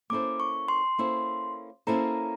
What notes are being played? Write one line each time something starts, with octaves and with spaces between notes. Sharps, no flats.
A#3 C#4 E4 A4 C5 D6
C#6
C6
A#3 C#4 E4 A4 C5
A#3 C#4 E4 A4 C5 A#5